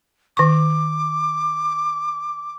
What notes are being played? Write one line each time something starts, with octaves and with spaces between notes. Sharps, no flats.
D#3 C#6 D6